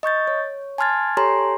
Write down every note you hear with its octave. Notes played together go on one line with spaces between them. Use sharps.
D#5 C#6 G6 A6
C#5
G#5 A5 C6 F6 G#6 A6
G4 A4 C#5 G#5 A#5 C6